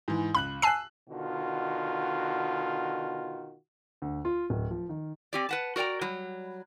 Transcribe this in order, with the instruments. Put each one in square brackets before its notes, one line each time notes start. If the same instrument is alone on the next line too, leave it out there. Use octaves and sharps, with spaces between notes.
[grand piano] G#2 E3
[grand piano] C#2 F#6 F#7 [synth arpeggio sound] B5
[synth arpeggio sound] G#5 A5 C7 [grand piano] E6 F#6
[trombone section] B2 D3 D#3 F4 F#4
[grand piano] D2
F4
D1
F3
D#3
[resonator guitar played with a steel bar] C4 G4 D5
B4 F#5 A5
F#4 A#4 D5 G5 A#5
F#3 G3